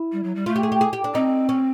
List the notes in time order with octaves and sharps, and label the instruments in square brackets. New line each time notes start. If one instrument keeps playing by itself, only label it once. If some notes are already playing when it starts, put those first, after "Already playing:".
Already playing: [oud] E4
[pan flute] G3
F#3
G3
[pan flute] A3 [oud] F4
[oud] G4
G#4
G4
G#4
G4
D4
[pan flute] C4 [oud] D#4
[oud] C#4